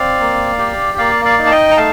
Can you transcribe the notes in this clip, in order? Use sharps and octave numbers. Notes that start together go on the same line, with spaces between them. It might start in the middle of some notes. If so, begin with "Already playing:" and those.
Already playing: C4 D5 F5
A#3
G4
A#3 D5 F5
D5 F5
D#4
A5
D#5 G5
A#5
A3 F5 A5